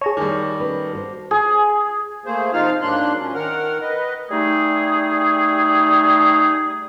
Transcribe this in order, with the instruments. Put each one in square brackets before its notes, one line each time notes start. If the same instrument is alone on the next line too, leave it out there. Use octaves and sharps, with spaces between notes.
[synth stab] G#4 C#5 [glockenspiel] A5 A#6
[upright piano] D#3 G3 [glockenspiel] D6
[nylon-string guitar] A3 C#4 B4
F#4 B4 C5
[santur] G#4
[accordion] A3 A#3 G#4 C5
C3 F3 D#4 F4 F5 F6
G#2 F#3 A#3 D4 C6 F#6
F3 C#4
D#3 A#4 F#5 F6
B4 D#5
[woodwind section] G3 A3 D#4 G#4